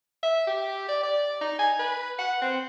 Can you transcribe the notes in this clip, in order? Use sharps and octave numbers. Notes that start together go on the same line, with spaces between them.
E5
G4
D5
D5
D#4
G#5
B4
F#5
C4